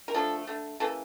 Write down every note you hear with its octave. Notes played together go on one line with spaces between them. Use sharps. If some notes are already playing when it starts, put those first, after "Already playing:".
A#4
D3 F3 A3 A4
D3 A3
C#3 E3 A#3 A4